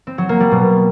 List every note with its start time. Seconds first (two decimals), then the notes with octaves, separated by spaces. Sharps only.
0.07 C4
0.18 F#3
0.29 A#3
0.40 G3
0.51 B2